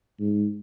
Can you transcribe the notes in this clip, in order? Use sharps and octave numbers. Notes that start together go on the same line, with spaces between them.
G#2